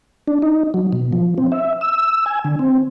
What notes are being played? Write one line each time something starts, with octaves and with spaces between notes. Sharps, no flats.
D4
D#4
F#3
B2
F3
C4
E5
E6
G#5
D3
C4